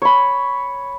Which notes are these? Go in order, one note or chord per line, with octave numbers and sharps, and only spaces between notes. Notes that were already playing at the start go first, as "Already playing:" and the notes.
C#5 B5